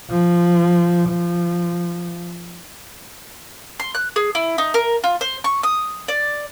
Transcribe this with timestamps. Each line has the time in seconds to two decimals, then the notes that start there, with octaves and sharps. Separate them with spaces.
0.10 F3
1.09 F3
3.80 C6
3.95 F#6
4.16 G#4
4.35 E4
4.58 D#4
4.74 A#4
5.04 F4
5.21 C5
5.44 C#6
5.63 D#6
6.08 D5